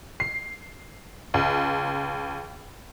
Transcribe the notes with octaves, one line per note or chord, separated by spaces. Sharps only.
C7
C#2